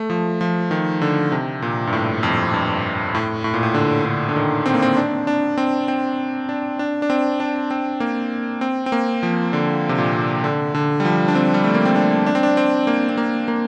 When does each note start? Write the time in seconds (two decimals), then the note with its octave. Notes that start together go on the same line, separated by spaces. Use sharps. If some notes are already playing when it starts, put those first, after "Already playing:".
Already playing: A3
0.10 F3
0.41 F3
0.71 D#3
1.02 D3
1.32 C3
1.62 A#2
1.87 G2
1.93 A2
2.23 F2
2.54 G2
3.15 A2
3.44 A2
3.54 A#2
3.63 A2
3.74 D3
4.06 D3
4.29 D3
4.36 D#3
4.66 C4
4.74 A#3
4.82 C4
4.97 D4
5.27 D4
5.58 C4
5.88 C4
6.49 D4
6.79 D4
7.02 D4
7.10 C4
7.40 D4
7.71 C4
8.00 A#3
8.61 C4
8.86 C4
8.92 A#3
9.23 F3
9.53 D3
9.89 C3
9.98 A#2
10.44 D3
10.74 D3
11.00 G3
11.05 F3
11.28 D4
11.35 C4
11.54 G3
11.64 A3
11.74 A#3
11.86 C4
11.96 D4
12.26 D4
12.35 C4
12.43 D4
12.57 C4
12.87 A#3
13.09 C4
13.18 A#3
13.48 A#3